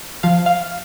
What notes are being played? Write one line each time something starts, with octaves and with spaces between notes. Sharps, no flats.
F3 F5
F5